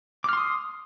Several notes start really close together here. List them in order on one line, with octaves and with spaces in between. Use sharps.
D6 F6 C6 D#6